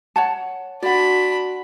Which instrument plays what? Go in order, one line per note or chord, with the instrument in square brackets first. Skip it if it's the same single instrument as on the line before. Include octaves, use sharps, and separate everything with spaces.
[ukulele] C#5 F#5 A5
[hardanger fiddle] D4 B5 [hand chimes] F#4 F#5 [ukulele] D5